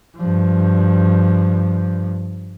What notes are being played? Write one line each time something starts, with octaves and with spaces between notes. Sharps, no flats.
G2 F3